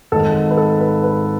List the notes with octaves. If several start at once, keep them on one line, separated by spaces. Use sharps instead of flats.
G#1 G#2 D#3 A4
B4
A4
B4
B4